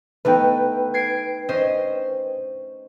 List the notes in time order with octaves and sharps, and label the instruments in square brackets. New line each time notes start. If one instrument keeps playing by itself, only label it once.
[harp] A3 B3 D#4 [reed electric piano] B4 G5
[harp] G#6 C7 D7
C#4 C5 D#5